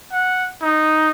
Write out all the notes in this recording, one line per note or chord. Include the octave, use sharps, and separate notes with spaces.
F#5
D#4